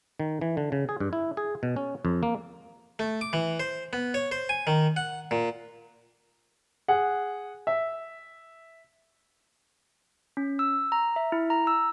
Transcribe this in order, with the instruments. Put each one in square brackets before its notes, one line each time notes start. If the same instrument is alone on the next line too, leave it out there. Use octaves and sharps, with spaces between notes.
[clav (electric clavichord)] D#3
E3
D3
C#3
G#4
G2
E4
G#4
B2
C#4
F2
A#3
[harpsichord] A3
D6
E3
C5
B3
C#5
C5
G#5
D#3
F#5
A#2
[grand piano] G#4 F#5
E5
[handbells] C#4
E6
A#5
E5
E4
A#5
E6